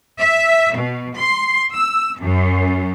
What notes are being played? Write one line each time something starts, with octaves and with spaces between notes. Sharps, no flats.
E5
B2
C6
E6
F#2